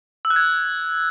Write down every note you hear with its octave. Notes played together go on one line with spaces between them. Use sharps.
E6
F#6
G#6